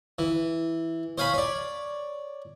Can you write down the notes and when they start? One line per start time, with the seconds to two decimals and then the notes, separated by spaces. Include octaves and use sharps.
0.19 E3
1.18 C5 C#5 F5 G#5 B5
1.34 C#5 D5